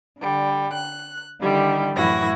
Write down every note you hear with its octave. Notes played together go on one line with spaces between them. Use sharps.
D3 G3
F#6
D3 D#3 G3 E4 G4
F#2 A2 E3 E4 F#4 A#6